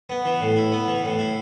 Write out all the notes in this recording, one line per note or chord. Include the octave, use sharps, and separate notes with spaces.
B3
E3
A2
E4
B3
E3
A2
E4